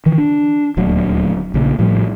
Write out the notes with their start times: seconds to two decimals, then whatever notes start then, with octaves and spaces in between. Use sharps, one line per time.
0.06 D#3 E3
0.18 D4
0.77 D#1 D2 D3 F#3
1.54 A#1 C#3
1.79 A2 F3 G3